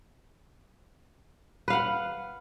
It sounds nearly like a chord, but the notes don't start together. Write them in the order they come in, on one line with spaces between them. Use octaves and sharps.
B4 F5 F#5